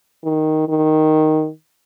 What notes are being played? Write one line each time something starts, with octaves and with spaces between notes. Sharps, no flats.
D#3
D#3